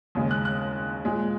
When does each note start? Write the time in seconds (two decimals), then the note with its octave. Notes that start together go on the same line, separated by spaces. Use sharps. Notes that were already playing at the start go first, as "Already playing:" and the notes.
0.15 D#2 C#3 G#3
0.31 F#6
0.45 F#6
1.05 A#2 G#3